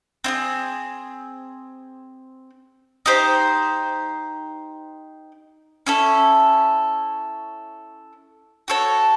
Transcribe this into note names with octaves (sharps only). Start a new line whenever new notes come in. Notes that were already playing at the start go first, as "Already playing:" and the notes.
C4 E4 G#4
D#4 G4 C5
C#4 E4 A4
F#4 A4 C#5